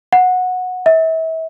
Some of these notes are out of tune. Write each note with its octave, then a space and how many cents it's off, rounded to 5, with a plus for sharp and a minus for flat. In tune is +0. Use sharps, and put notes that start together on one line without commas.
F#5 -15
E5 -35